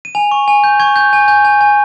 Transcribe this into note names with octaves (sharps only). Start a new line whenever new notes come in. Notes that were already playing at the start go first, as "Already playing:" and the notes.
D#7
G#5 F7
C#6
G#5
G6
C#6 G#6
G6 G#6
G#5
G#5 G6
G#5
G#5